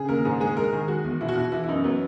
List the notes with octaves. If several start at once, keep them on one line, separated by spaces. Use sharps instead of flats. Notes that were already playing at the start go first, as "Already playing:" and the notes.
Already playing: C#3 G#4
D#2 A#4
G#2 G#4
G#3 G#4
G#3 A#4
D#3 G#4
G#3 F#4
E2
B2 E4
F#4
B2 E4
E3 E4
E4
F#2 D#4
F#3 B3